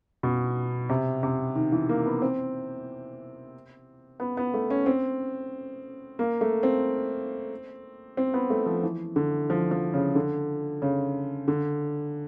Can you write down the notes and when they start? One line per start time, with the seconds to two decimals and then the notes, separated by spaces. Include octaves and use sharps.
0.23 B2
0.89 C3
1.23 C3
1.55 D#3
1.72 E3
1.89 A#3
2.06 B3
2.22 C4
4.20 B3
4.37 B3
4.54 A3
4.70 C#4
4.86 C4
6.19 A#3
6.41 A3
6.63 C4
8.17 C4
8.34 B3
8.50 A3
8.66 F3
8.83 E3
9.16 D3
9.50 F3
9.71 F3
9.94 C#3
10.15 D3
10.82 C#3
11.48 D3